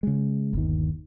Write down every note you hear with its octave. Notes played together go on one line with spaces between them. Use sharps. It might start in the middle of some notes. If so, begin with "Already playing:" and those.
C#3 G#3
G1 D#2 D#3